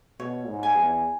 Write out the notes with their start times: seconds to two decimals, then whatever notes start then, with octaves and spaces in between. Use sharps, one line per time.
0.19 B2 C#5
0.48 G#2
0.63 G#5
0.77 E2